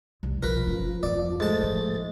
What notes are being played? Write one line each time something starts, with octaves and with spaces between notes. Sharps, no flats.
F1 C2
B1 F3 A#4 B4
G1 C#4
F2 B3 D5
G#2 A3 A5 A6
A1 F3